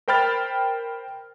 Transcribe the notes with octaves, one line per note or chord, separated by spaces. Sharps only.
A#4 C5 G5 B5 F6 A6